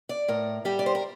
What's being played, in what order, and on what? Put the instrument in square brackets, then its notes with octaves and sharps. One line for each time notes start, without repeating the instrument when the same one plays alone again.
[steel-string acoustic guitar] D5
A2 A#4
G3 G4
D5
C5
A#4